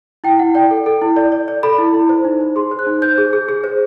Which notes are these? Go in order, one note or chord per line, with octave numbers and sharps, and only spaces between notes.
E4 G5
E4 F#5
D5 G5
A4
A4
E4
D5
D5
D5
A4 B5
E4
E4
C5
D#4
C5
G#4 C6
C5
F#6
D#4
C5 G6
G#4
G#4
G#4
C5